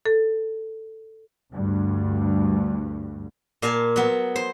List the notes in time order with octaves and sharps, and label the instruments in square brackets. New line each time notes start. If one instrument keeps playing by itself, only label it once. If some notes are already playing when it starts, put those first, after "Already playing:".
[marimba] A4
[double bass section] D2 G2
[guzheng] A#2 F5 G#5 A5
F#3 B3
C5